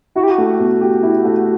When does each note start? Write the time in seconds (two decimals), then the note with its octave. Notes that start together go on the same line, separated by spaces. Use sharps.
0.15 E4 F#4
0.23 G4
0.31 F#4
0.38 A3
0.59 B2
0.81 G4
1.03 E4
1.25 A3